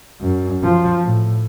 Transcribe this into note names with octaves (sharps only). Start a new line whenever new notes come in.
F#2
F3
A2